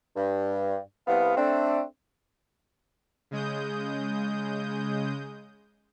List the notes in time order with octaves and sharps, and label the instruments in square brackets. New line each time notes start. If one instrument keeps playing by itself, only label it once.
[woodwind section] G2
C2 B3 F5
A3 C4 D4
[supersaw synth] C#3 G#3 D#6 G6